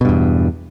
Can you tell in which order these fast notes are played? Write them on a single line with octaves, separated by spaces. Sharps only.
B2 G2 E2